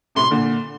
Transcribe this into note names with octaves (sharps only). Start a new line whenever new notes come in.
A2 C3 C6
A#2 D3